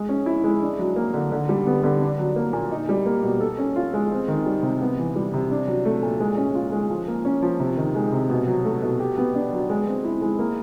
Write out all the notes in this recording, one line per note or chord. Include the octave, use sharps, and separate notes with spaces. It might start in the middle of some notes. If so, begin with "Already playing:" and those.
Already playing: G#3
C#4
E4
G#3
D4
F#3
A#3
D3
D3
G3
B3
D3
D4
F#3
A#3
A#2
D#4
G3
A#3
B2
A4
C#4
F4
G#3
C4
D#3
G3
C3
B3
E3
G3
C3
D4
F#3
A3
A#2
G#3
C#4
F4
G#3
F3
A#3
C#4
F3
C3
D#3
G#3
C3
B2
F#3
A3
B2
G4
B3
D4
F#3
G#3
C4
E4
G#3
A#3